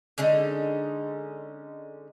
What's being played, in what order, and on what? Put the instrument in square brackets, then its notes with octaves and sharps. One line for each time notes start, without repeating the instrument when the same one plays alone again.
[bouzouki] D3 G#3 C#4 D#4